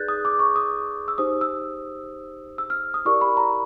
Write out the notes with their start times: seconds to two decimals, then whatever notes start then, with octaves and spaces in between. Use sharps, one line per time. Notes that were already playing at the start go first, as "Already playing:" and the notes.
Already playing: D#4 G#4 B4 D5 F#6 G6 A6
0.08 D#6
0.25 D6
0.39 C#6
0.56 D#6
1.08 E6
1.18 D#4 G4 C5 D#6
1.41 E6
2.58 E6
2.70 F6
2.94 D#6
3.05 E4 G4 A#4 D5 C#6
3.21 B5
3.37 A#5